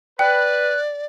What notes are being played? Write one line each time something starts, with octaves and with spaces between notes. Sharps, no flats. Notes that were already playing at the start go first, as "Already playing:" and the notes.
B4 D5 G5 F#6